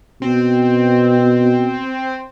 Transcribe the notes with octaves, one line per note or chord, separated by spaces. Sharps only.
B2 C4